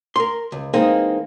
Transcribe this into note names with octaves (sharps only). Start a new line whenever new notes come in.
A#4 C6
C#2
E3 G#3 A#3 C4 D#4